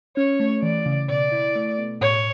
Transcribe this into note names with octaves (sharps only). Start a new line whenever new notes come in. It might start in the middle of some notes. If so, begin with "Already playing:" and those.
C#4 C#5
A3
E3 D5
C#3
B2 D5
E4
A3
B2
A2 C#5